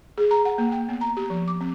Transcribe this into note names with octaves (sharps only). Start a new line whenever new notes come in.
G#4
A#5
F#5
A#3
G5
B3
A#5
G4
F3
D6
C4